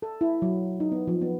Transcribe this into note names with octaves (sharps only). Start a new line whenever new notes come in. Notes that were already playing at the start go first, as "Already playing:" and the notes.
A4
E4
F#3
D#4
B3
F3
B3